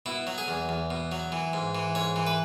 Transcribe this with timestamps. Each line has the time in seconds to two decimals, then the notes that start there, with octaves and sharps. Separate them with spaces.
0.06 B2 E4
0.27 F#3
0.38 G#4
0.48 E2
0.69 E2
0.90 B2
1.12 F#3
1.32 E3
1.53 G#2
1.75 E3
1.95 G#2 C#5
2.16 E3
2.27 B4